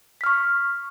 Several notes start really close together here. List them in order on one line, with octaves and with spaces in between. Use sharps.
B6 F6 C#6